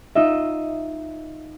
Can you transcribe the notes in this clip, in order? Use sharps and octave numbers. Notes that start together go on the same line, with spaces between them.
D#4 F4 D#5 E5